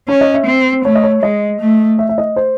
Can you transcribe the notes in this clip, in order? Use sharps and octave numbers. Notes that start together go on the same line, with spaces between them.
C#4 C#5
D#5
E5
C4
A3 C#5
D#5
C#5
G#3 D#5
A3
E5
E5
D#5
C5